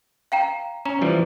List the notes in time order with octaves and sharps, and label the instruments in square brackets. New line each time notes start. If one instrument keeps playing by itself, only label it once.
[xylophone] F5 G5 A#5
[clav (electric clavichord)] C#4 [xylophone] A#5
[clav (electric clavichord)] E3 F3 G3